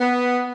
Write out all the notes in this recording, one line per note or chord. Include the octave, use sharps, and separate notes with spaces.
B3